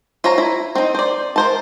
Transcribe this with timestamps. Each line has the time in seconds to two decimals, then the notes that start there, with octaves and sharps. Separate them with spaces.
0.24 F4 C5 C#5 A#5
0.38 E4
0.75 C4 D#4
0.95 C5 D5
1.36 A#4 C5 A5